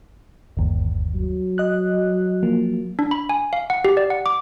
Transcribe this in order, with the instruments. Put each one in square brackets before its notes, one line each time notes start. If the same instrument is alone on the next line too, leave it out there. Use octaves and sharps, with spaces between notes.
[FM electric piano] G1 D#2
[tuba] F#3
[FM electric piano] D#5 F#6
F3 A#3
[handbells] D4
B5
G#5
F5
F#5
G4
D5
F#5
D6